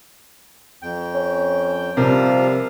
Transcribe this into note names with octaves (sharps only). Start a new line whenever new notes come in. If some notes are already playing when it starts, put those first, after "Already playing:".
F2 G5
C#4
C3 F3 G3 A#4 F5